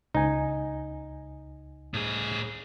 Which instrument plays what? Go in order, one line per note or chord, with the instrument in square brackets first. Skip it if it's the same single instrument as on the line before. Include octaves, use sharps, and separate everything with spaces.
[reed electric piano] C#2 G#5 [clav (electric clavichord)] D#4
[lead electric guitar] A2 G#4